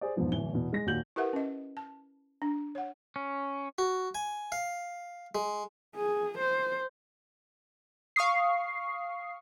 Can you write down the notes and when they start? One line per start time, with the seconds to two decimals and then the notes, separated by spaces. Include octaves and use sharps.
0.01 G#4 C5 D5
0.16 E1 G#2 F3 B3
0.32 D1 E3 G7
0.53 E2 B2
0.73 G#3 A#6
0.86 D#2 A#2 F#4 G6 F#7
1.16 E4 G4 A#4 B4 E5 F#5
1.33 C#4 D#5
1.77 A5
2.42 D4
2.75 C#5 F#5
3.16 C#4
3.78 F#4
4.15 G#5
4.52 F5
5.35 G#3
5.96 G#4
6.39 C5
8.16 F5 C#6 D#6 C7